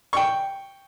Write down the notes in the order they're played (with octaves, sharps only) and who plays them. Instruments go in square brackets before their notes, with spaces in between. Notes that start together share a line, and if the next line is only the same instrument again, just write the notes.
[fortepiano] G5 C#6